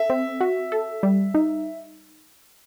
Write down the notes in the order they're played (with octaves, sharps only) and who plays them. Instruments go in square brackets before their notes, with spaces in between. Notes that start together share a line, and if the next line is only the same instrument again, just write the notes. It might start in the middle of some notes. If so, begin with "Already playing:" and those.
Already playing: [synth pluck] A4 [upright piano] E5
[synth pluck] C4
F#4
A4
G3
D#4